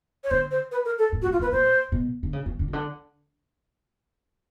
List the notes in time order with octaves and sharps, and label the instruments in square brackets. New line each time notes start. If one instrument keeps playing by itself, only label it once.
[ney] C#5
[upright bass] D3 [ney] C5
[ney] C5
B4
A#4
A4
[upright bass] G#2
[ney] F#4
[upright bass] A2
[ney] F4
[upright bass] A#2 [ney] B4
[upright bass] A#2 [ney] C5
[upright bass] B2
D3
C#3
D#3
D3
C#3
D3